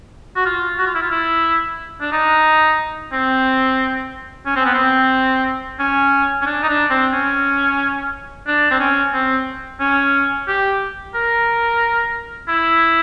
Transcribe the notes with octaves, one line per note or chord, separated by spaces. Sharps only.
F#4
F4
F#4
F4
E4
F4
E4
D4
D#4
C4
C#4
C4
B3
C4
C#4
C#4
D4
D#4
D4
C4
C#4
D4
C4
C#4
C4
C#4
G4
A#4
E4